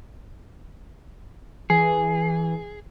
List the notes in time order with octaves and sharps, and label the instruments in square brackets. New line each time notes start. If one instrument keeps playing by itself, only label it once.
[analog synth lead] E3 [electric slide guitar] G#4